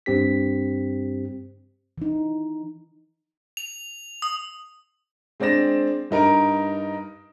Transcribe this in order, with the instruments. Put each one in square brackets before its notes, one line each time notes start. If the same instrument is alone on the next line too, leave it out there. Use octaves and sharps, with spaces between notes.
[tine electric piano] G2 C4 G4 B6
[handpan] E3 D#4
[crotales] F7
D#6
[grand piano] G#3 C4 D4 D5 A#6 E7
G2 D#4 A#4 A#5 D7